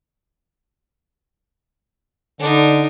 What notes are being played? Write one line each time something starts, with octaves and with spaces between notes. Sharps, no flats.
D3 D4 D#4